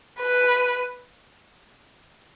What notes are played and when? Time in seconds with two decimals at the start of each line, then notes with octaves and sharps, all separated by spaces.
0.20 B4